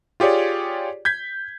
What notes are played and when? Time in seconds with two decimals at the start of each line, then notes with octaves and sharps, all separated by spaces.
0.20 F4 G4 G#4 C#5 D5
1.05 G6 G#6 B6